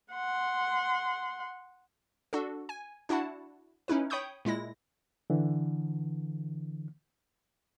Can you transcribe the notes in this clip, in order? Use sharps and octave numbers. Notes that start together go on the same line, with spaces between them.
F#5 C6
D4 F#4 A4
G#5
D4 E4 F#4 F#5 A5
C#4 D#4 E4 B4
C#5 G5 B5 C#6 D#6 G6
A#2 G#3 E4 A#6
D3 E3